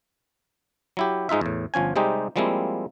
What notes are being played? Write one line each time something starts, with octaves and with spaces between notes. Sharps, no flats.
F#3 E4 G4
G#2 G#3 D#4 F4 E5
E2 A2
G1 F3 C#4 G#5
C3 G3 G#3 C4 D#4 G4
F3 G3 G#3 A#3 C4 E4